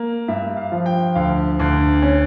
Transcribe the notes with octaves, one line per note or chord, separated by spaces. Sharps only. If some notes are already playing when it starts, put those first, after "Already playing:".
Already playing: A#3
G2 E5
F5
F3
G5
D2 F5
D2
C#4